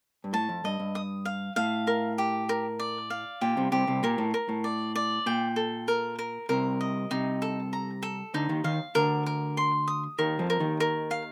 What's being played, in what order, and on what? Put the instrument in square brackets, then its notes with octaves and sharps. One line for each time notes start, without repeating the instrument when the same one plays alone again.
[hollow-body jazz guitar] G2
[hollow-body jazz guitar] A2 [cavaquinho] A5
[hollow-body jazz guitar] F2
[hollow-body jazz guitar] G2 [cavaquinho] D#5
[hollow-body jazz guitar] G2
[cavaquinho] D#6
F5
[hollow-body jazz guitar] A2 [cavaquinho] F5
[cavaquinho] A#4
G4
A#4
D5
F5
[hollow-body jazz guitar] A#2 [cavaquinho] G4
[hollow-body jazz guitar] C2 C3
[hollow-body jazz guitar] C2 C3 [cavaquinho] G4
[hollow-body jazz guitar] C2 C3
[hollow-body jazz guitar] A#2 [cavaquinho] A#4
[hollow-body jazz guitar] A2
[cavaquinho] A#4
[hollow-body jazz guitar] A2
[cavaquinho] D5
D5
[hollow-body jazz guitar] A#2 [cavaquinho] G5
[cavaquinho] A4
A#4
A#4
[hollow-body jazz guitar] C2 C3 [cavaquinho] A#4
[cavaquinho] D#5
[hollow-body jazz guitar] C2 C3 [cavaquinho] D#4
[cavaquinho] A4
A#5
A4
[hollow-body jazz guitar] D2 D3 [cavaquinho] D#4
[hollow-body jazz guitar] D#2 D#3
[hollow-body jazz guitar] D#2 D#3 [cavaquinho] F5
[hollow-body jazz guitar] D2 D3 [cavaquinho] A#4
[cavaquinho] A#4
C6
D#6
[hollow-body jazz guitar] D#2 D#3 [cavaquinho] A#4
[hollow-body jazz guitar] F2 F3
[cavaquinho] A#4
[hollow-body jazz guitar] D#2 D#3
[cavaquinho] A#4
F5